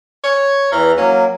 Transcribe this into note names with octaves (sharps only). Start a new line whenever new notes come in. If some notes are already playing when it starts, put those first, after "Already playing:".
C#5
E2 E3 A#5 F6
F#3 A#3 C#4